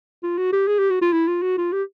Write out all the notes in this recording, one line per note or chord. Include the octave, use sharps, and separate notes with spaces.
F4
F#4
G4
G#4
G4
F#4
F4
E4
F4
F#4
F4
G4